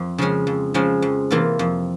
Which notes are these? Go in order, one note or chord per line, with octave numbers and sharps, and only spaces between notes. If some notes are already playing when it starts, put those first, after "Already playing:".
Already playing: F2
C#3 F3 G#3 C#4
F2
C#3 F3 G#3 C#4
F2
C3 E3 A#3 F4
F2